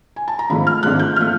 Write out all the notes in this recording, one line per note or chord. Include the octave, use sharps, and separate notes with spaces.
G#5
A5
A#5
G#1 G#2 F3 A3 B5
F6
G#1 G#2 F3 A3 F#6
G6
F3 A3 F6